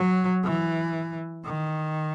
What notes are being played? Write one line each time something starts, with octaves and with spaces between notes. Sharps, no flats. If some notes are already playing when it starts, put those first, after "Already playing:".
Already playing: F#3
E3
D#3